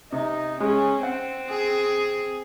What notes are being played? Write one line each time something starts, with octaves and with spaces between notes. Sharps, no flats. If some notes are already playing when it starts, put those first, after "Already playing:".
C3 D#4
G#3 C#4
C4 F#5
G#4